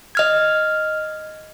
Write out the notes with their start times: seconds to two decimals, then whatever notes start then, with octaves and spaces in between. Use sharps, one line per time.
0.15 D#5 F6 G#6